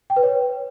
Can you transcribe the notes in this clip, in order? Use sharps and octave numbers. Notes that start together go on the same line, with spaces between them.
G5
B4
C#5